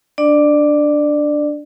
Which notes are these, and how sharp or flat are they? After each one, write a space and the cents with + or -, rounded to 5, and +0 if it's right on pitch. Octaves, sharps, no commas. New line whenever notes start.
D4 +0 D5 +20